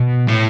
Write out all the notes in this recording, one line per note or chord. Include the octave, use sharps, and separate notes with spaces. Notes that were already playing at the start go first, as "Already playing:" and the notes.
Already playing: B2
A2